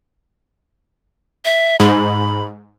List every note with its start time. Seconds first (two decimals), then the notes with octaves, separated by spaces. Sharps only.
1.45 E5
1.80 G#2 B5